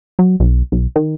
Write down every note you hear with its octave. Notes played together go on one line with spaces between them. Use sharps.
F#3
B1
B1
D#3